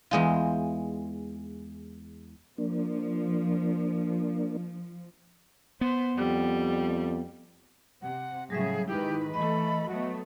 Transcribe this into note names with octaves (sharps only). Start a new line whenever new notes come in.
E2 G#3 F4
F3 A#3 D4
B3 C5
F2 G3
C3 F#5
A2 C#3 F#3 G3 G#4 E5
G#2 D#3 D#4 E4 G4 B4
E3 A3 A4 D#5 B5
F#3 A3 B3 F#4